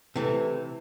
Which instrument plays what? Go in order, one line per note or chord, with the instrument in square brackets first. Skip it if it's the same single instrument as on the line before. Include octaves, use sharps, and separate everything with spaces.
[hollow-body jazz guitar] C3 E3 A3